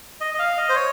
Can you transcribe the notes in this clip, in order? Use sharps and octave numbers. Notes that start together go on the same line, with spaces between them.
D#5
D#5
F5
D#5
C5
C#5